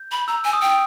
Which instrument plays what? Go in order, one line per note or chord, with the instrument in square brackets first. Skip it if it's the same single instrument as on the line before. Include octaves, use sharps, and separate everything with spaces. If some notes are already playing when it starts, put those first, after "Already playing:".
Already playing: [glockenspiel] G6
[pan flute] B5
[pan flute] A#5 [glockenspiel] E6
[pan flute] G#5
[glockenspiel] D#6
[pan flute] G5